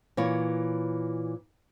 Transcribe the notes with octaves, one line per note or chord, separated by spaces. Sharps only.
A#2 E3 C#5